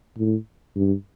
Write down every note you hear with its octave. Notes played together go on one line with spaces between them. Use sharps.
A2
G2